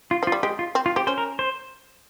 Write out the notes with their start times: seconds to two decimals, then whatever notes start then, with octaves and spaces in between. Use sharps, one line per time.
0.11 F4
0.23 F3
0.27 F4
0.32 G3
0.43 G#3 G4
0.59 F4
0.75 C4
0.86 F4
0.96 C4 G4
1.07 C#4 C5
1.18 A#4
1.39 C5